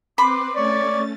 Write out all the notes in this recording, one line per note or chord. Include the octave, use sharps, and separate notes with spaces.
C4 B4 B5 C6 D6
A3 C#4 C#5 D5 C#6 A6